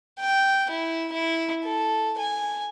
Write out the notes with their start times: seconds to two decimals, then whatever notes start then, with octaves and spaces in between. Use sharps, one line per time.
0.20 G5
0.70 E4
1.12 E4
1.64 A4
2.19 G#5